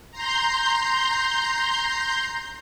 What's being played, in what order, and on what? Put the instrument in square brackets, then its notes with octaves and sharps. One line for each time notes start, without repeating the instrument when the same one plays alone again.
[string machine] A#5 C6 G6